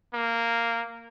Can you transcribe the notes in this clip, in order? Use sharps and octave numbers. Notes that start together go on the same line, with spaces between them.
A#3